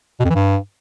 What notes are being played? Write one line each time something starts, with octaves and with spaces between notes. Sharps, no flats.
B2
F2
E3
G2